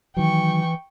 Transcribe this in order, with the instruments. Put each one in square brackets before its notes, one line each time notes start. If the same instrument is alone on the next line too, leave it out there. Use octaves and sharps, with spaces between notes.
[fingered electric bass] D#3 F#3 [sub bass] E3 [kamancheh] G5 C#6